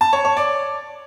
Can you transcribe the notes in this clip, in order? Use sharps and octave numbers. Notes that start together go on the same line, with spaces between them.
A5
C#5
C#5
D5